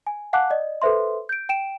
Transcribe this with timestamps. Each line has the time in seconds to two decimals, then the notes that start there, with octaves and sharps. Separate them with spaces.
0.07 G#5
0.33 F5 F#5 G#5 A5 D6 F#6
0.50 D5 D#5
0.82 A4 B4 C5 E5 C6
1.29 G6 D7
1.49 G5 D7 E7